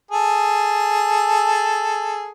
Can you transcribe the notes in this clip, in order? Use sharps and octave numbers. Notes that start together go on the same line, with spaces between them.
G#4 A4